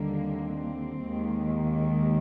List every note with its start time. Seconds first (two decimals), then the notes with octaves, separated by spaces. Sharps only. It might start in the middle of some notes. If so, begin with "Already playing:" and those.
Already playing: D#2 D3 G3 A#3
0.18 C4
1.06 D#2 D#3 G#3